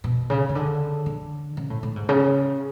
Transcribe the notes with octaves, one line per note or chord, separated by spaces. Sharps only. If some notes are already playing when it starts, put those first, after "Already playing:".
B2
C#3
C#3
D3
D3
C#3
A2
A2
G#2
C#3